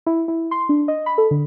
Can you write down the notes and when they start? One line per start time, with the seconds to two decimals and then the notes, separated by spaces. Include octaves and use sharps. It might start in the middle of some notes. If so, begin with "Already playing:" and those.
0.06 E4
0.28 E4
0.51 C6
0.69 D4
0.88 D#5
1.06 B5
1.18 A4
1.31 D3